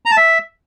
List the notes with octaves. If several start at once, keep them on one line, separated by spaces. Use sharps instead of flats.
A#5
A5
E5